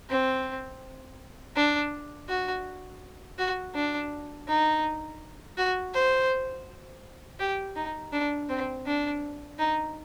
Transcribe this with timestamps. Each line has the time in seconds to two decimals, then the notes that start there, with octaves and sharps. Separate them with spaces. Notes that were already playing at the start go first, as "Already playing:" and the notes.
0.10 C4
1.56 D4
2.29 F#4
3.38 F#4
3.74 D4
4.48 D#4
5.57 F#4
5.94 C5
7.39 G4
7.76 D#4
8.13 D4
8.49 C4
8.86 D4
9.59 D#4